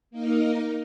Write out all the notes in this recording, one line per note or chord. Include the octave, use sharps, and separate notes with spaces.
A#3 D#4 A#4